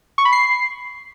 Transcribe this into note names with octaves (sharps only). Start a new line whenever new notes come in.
C#6
B5
C7